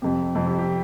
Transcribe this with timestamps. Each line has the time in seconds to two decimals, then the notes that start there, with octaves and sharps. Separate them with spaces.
0.02 F2 C3 G4
0.35 F2 C3
0.47 G4
0.59 G4